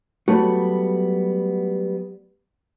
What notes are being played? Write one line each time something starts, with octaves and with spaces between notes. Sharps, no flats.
F#3 G3 A3 B3 F#4